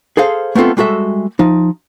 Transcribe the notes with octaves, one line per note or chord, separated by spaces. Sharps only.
G#4 A4 C5 F5
A3 B3 C4 F4 A4
G3 G#3 F#4 A4 E5
F3 D#4